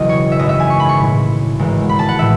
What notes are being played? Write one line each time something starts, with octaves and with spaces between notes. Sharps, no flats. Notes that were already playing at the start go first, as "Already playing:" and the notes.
Already playing: E1 E2 C#3 F#3 D#5
C#5
E5
G#1 F#2 E3 D#5
E5
G#5
C#6
B5
C#6
B1 A2 E3
G#1 G#2 E3
B5
A5
F#5
A2 E3 E5